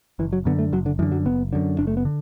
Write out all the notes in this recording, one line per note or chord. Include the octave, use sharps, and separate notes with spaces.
F#1 E3
F#3
F#2 D3 B3
A3
F#1 F#3
D3
F#2 D3 E3
F#3
F#1 B3
F#2 D3
F#1 D4
A3
B3
D3